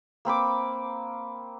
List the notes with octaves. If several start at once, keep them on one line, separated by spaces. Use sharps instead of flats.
A#3 C4 B5 D6